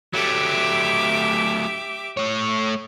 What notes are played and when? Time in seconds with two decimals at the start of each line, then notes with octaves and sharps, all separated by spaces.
0.13 F#3 A3 G4 E5 D6
2.17 A3 C#5